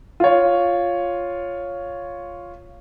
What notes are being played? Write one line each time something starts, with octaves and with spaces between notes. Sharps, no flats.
F4 C#5